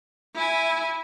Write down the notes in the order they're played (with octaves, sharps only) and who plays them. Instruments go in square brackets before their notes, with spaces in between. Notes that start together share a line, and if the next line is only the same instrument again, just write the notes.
[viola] E4 G#5